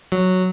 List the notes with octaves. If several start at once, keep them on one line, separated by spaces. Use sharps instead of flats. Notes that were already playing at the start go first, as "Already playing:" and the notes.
F#3